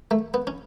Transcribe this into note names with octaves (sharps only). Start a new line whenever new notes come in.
A3
B3
C#4